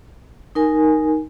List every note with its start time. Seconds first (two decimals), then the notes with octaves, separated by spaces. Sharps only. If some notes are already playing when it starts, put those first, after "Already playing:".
0.55 D#4 A#4 G#5